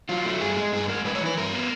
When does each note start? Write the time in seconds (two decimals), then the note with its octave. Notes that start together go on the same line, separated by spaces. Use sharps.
0.09 F#3 F4
0.25 A3
0.41 G2 G#4
0.57 G#3
0.72 G2 G#4
0.88 G#3 A#4
1.05 G#3 B4
1.15 C#5
1.21 E3
1.26 B4
1.37 G2 A#4
1.53 B3